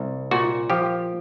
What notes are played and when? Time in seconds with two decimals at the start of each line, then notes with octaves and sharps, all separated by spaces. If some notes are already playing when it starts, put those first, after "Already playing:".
Already playing: C2
0.31 A#2 F#4
0.70 F3 G4